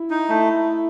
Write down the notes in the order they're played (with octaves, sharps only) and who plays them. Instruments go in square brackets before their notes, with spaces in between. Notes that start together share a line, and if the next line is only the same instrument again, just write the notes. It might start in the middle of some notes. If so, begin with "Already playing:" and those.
Already playing: [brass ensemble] E4
[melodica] D#4
A3